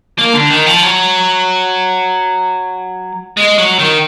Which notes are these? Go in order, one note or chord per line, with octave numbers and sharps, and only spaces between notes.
A#3
D3
D#3
F3
F#3
G#3
F#3
D#3